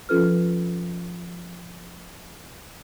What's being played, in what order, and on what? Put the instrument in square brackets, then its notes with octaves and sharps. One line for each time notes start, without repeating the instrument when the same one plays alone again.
[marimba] F3 C#4 F4 A4 B4 F6